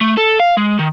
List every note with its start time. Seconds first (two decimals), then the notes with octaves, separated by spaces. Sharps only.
0.01 A3
0.17 A4
0.40 F5
0.57 G#3
0.79 D#3